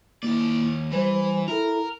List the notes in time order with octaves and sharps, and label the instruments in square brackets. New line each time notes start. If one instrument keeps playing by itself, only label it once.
[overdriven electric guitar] D#2 D5 [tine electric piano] A#3 E4
[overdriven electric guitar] E3 [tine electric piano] G3 C5
[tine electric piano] E4 A4 [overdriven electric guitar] A#4